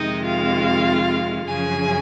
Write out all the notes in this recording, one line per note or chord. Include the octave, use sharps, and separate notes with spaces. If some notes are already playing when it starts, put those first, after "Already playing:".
Already playing: F2 C3 D#3 G#3 D#4 D#5
F4 F5
F#2 C#3 F3 G#4 G#5